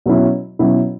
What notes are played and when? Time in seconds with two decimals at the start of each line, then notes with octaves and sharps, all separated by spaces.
0.06 B2 F#3 C#4 E4
0.59 B2 F#3 C#4 E4